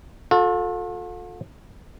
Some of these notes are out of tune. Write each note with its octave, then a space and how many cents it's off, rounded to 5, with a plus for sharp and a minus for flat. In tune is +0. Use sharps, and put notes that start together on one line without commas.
F4 +45 A4 +0